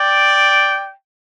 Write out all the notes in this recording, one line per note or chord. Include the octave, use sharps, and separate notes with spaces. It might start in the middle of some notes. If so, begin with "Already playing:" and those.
Already playing: D5 G5